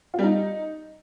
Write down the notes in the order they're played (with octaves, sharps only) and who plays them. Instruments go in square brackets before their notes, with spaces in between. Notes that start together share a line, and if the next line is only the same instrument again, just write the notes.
[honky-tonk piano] F4
G3
D#4